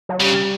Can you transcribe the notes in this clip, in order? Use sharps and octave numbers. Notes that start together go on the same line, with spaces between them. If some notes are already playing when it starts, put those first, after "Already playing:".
F#3
C#3 G3